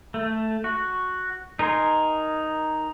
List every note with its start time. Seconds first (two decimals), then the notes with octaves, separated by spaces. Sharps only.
0.14 A3
0.64 F#4
1.59 D#4 A#4 G#5 C6